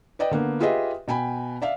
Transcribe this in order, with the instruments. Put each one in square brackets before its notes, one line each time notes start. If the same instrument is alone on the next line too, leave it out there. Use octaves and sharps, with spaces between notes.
[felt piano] B4 D5 D#5 G5
D3 A#3 B3
F4 G4 G#4 B4 D#5 E5
B2 G5 G#5 B5
D5 E5 F5